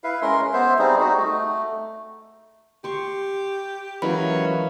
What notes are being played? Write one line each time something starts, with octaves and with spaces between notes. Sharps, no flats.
E4 B4 E5 F5
G#3 C#4 A#4 C6
B3 C5 E5
G3 C4 D#4 G#4
D#4 F#4
A3
G4 C6 C#6
E3 F#3 G#3 A#3 C#4 B5